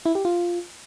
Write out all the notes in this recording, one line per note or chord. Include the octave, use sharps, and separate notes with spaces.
E4
G4
F4